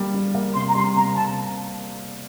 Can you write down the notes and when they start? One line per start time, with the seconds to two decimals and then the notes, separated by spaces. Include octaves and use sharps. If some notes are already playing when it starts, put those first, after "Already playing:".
Already playing: G3 A#3
0.14 G3
0.35 A#3
0.55 C3 C6
0.69 A#5
0.75 G3 C6
0.95 C3 A#5
1.15 C3 A5